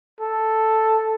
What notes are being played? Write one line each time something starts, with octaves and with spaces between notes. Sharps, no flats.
A4